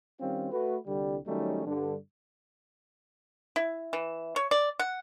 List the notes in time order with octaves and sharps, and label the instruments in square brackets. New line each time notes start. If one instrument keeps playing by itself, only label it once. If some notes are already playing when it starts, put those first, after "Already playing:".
[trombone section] D#3 G3 C4 C#4 F4
A3 F#4 B4
C2 D3 G3
D#3 F#3 G3 A3 C#4 D#4
G2 D3
[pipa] E4
E3
C#5
D5
F#5